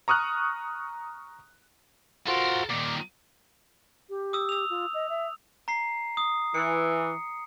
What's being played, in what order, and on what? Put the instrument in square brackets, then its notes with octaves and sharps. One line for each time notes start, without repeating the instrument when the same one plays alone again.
[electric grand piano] A#5 C#6 D#6 F6 F#6
[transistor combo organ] F4 F#4 C5 [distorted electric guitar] A4 A#4
[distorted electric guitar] A#2 D#3 [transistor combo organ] D6
[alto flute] G4
[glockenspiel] D#6 E6
E6 F7
[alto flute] F4
D#5
E5
[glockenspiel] A#5 C7
D#6
[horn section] E3 [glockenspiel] C#7